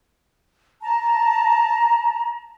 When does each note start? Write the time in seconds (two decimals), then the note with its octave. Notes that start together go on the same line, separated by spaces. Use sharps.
0.82 A5 A#5